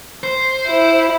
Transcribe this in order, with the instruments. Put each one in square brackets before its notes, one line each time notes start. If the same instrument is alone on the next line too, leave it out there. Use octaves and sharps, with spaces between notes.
[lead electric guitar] C5
[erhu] E4